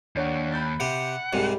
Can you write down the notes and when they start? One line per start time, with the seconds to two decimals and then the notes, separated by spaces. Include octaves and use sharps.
0.16 D#2 D4 C#5 F#5
0.52 B5 G6 A6
0.80 C3 G4 F#5
1.33 C2 G#2 C3 G3 G4